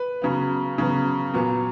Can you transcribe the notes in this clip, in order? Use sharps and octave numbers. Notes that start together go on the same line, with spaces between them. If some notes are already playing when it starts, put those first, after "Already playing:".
Already playing: B4
C#3 F#3 B3
C#3 F#3 B3
A#2 F#3 B3